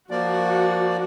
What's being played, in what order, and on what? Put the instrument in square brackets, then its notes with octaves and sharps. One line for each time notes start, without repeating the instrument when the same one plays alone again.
[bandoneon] F3 A#3 D5 [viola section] F#4